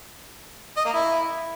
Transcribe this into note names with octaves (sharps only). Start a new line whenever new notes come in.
D#5
A#3
E4